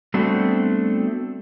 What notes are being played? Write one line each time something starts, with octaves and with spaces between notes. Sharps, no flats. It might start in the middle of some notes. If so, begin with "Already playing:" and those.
G3 A3 B3 C4 D4 F#4